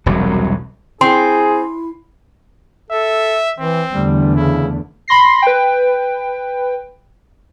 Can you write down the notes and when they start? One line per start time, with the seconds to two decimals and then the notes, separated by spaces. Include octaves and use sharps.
0.06 E1 C2 F#3
1.01 C4 E4 G#4 C6
2.90 A4 E5
3.59 E3 C4
3.91 E2 D3 G3 A3
4.36 C#3 E4
5.08 B5 C6 A#6 C7
5.42 B4 G5